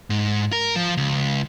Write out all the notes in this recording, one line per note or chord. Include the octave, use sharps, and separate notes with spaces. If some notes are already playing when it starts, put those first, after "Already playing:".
G#2
A#4
F3
C#2